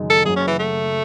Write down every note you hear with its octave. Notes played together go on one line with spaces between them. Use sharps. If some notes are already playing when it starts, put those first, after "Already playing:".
Already playing: F#1 F#2 D#3 G#3 D#4
A4
F#1 F#2 C#3 F#3 G#4
C#4
E3
A3